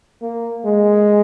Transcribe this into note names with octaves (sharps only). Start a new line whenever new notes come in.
A#3
G#3